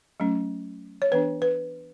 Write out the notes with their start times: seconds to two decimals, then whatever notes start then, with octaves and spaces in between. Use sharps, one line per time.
0.20 F#3 A3 C#4
1.02 C#5
1.11 E3 B3 D4 B4
1.42 B4